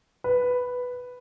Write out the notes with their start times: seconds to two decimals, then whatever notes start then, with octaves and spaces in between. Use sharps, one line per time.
0.24 B4